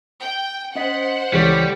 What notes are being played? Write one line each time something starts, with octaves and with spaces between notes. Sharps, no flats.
G5
C#4 C5 D#5 F#5 B6
C#2 E3 G3 A4 C#5 C#7 D7